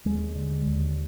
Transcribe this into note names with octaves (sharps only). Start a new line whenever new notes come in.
D#2 G#3
D3
D#2